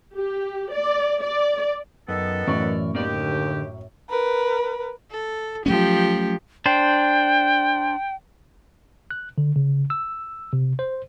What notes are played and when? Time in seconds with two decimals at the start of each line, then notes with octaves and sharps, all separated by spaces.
0.15 G4
0.72 D5
1.21 D5
2.08 F#2 D#3 B3 A4
2.47 F#2 A2 E3 A#4 D5 C#6
2.95 D#2 A#3 B3 G4 D5
3.09 D3
4.10 A#4 B4
5.11 A4
5.66 F3 F#3 A3 C#4 G4
6.66 D4 C5 G5
9.11 F#6
9.38 D3
9.56 C#3
9.90 E6
10.53 C3
10.79 C5